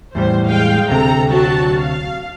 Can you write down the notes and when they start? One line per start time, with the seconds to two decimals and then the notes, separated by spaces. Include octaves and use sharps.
0.15 E2 A2 G3 C5
0.47 G#3 F5 G5
0.89 D2 C3 A4 A#5
1.29 F#3 F#4 A5
1.78 F5